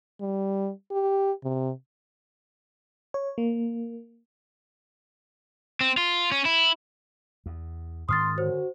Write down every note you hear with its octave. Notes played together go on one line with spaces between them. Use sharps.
G3
G4
C3
C#5
A#3
C4
F4
C#4
E4
E2
G#2 D#3 C#4 C6 D#6 F6 A6
F#2 D3 F#4 C5